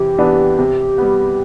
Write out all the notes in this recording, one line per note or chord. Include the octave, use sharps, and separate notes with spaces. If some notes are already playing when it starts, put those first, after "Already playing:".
Already playing: C3 E3 G4
E3 B3 D4
C3
G3 B3